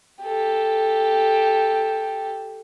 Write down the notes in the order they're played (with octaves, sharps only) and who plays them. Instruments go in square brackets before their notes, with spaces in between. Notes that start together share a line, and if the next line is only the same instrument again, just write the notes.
[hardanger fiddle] G4 A4